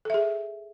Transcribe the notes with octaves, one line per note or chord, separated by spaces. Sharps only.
G#4 A4 E5